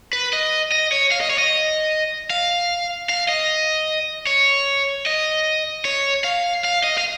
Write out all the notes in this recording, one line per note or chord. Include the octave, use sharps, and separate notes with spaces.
B4
D#5
D#5
C#5
F5
D#5
C#5
D#5
F5
F5
D#5
C#5
D#5
C#5
F5
F5
D#5
F5